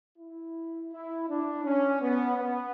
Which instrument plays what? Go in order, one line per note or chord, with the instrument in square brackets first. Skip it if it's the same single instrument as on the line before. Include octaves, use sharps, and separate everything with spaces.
[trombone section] E4
E4
D4
C#4
B3
B3